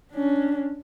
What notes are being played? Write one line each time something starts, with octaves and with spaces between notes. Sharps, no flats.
C#4 D4